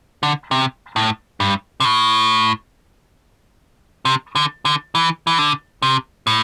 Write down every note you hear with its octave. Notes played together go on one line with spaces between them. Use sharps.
D3
C3
A2
G2
C3
A2
C3
D3
D3
E3
E3
D3
C3
A2